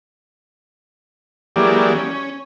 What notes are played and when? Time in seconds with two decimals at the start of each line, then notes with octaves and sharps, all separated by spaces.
1.56 E3 F#3 G#3 A#3 G4 D5
1.95 C#4